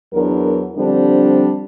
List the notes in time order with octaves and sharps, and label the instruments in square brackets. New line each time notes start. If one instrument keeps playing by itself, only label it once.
[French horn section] E2 F#3 D4 A#4
D3 F3 G3 C4 D4